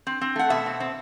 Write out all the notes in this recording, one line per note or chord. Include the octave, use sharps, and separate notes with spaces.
C4
C4
A3 F#5
B2 E5
C4
C4